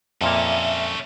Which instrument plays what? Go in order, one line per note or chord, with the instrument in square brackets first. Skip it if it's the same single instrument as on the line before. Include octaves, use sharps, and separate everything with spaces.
[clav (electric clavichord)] F2 A#2 A#3 [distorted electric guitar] C#4 A4 [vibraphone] E5